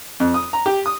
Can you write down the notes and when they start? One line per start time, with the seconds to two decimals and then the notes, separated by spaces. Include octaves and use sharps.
0.20 F2
0.34 D#6
0.53 A#5
0.66 G4
0.86 D#6